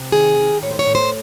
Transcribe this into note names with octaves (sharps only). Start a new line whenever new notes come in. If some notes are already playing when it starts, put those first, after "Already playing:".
Already playing: C3
D#3 G#4
D#3
A2 C#5
C5
C#5
A2
C5